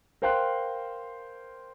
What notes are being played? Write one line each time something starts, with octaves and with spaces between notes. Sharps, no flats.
A#4 C5 F5 G5 C6 F#6